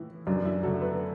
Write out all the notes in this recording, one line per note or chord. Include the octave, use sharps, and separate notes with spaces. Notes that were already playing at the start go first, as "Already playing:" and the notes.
Already playing: A2 E3 E4
F#2 D4
E4
D3 F#3 A4
B4